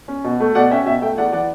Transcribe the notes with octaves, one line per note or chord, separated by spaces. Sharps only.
C#4
B2
A3
B2 D5 F#5
C#4 E5 G5
B2 E5 G5
A3 E5 G5
E2 D5 F#5
E3 D5 F#5